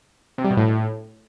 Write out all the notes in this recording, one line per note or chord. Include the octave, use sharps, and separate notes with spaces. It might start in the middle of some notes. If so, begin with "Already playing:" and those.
C3
G3
B2
A2